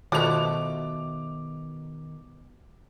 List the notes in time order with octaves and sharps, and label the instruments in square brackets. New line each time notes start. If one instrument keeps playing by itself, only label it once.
[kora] B2 F#4 [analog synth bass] D#3 [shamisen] F3 A3 E4 [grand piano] D6 F7